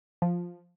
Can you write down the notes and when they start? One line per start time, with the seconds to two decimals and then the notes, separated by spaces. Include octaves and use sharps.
0.22 F3